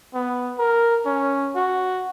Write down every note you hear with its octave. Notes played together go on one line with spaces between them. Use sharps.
B3
A#4
C#4
F#4